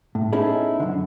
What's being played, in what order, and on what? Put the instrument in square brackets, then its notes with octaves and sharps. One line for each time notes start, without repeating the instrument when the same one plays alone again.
[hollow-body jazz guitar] A2
B3 C#4 D#4 E4 G#4 A4
F#2 D3